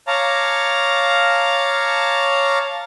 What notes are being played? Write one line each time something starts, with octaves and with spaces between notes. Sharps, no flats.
C#5 F5 A5 A#5 D6